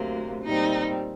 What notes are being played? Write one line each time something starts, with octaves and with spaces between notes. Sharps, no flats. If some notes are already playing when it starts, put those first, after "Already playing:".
Already playing: D2 C3 F#3 A#3
A#2 G3 C4 D#4